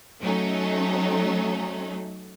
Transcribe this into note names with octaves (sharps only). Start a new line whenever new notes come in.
F#3 A3 C#4 D#4